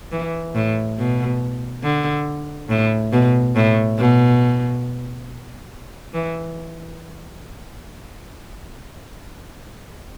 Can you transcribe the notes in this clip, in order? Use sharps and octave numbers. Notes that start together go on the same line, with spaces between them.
E3
A2
B2
D3
A2
B2
A2
B2
E3